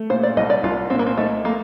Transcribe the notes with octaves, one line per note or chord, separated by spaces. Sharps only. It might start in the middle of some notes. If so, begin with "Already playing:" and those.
Already playing: A3
A#2 C5
D5
C2 D#5
D5
C2 F4
A#2 C4
A#3
C4
A3 D#4
A3 A#3